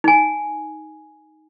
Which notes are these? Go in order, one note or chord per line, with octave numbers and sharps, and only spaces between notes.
D#4 G#5